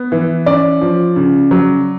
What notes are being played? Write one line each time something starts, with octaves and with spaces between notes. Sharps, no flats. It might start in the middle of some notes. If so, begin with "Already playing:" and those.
Already playing: B3
E3
C#4 D5
F3
C#3
F#3